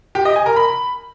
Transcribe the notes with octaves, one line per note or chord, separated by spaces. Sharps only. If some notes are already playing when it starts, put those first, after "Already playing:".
G4
D#5
G#5
A#4
B5